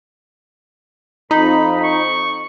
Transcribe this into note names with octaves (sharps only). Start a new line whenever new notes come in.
F2 D#4 B5
C#6